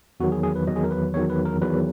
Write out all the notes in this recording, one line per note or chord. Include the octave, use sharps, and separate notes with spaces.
E2 D#3 F#3 F#4
G#4
G#4
B4
E2 D#3 F#3 D#5
G#4
A#4
B4
E2 D#3 F#3 C#5
B4
A#4
E2 D#3 F#3 B4